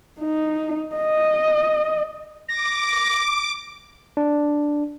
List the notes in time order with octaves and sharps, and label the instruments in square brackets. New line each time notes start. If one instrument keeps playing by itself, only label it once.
[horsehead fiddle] D#4
D#5
[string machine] D6 [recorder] A#6
[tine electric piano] D4